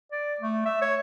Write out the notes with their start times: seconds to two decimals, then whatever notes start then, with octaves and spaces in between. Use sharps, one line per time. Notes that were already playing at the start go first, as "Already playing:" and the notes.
0.12 D5
0.41 A3
0.66 E5
0.82 C#5